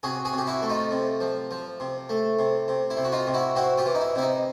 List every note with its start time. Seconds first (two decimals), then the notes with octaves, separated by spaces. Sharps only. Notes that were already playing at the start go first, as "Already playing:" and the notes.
0.03 C3 F#4 G#4
0.25 F#4 G#4
0.33 C3 G4
0.47 E4 F#4
0.62 A3
0.70 D#4 F4
0.91 C3
1.20 F3
1.51 F3
1.80 C3
2.09 A3
2.39 C3
2.68 C3
2.90 E4
2.97 C3
3.05 F#4
3.12 D#4 F4
3.27 C3
3.34 E4 F#4
3.56 C4 E4 F#4
3.78 F4 G4
3.85 E3
3.95 D#4
4.01 E4
4.15 C3 E4
4.22 D#4